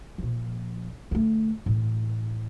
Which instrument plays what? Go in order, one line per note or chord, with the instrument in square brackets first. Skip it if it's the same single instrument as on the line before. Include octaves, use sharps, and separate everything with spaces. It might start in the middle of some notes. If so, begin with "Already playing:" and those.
[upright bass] A#2 F3
D3 A3
A2 E3